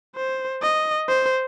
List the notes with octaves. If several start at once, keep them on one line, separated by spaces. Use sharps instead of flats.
C5
D#5
C5